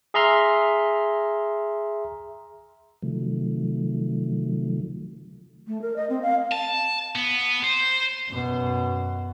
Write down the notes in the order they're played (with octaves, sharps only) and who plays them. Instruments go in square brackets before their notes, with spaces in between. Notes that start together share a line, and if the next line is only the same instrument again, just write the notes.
[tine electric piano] G#4 E5 A#5 C6 F6
[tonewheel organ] C3 D#3 F3 F#3 A3
[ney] A3
A#4
D#5
C4
F5
[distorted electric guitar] A5
B3
C5
[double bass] F#2 B2